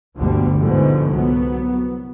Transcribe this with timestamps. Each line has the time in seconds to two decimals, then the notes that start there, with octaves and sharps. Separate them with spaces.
0.18 G1 D2 B2 D3 F3 G3
0.60 G#2 B2 D3 F3 G#3 A3
1.09 C2 F#3 B3